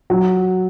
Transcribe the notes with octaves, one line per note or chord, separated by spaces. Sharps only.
F#3